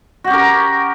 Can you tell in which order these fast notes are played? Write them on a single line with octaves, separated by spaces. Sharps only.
F#4 G4 C#4 A#4